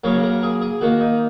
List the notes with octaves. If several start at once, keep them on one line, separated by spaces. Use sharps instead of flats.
C#3 F#3 A#3 C#5
A#4
G#4
G#4
D#3 A#3 F#4
D#4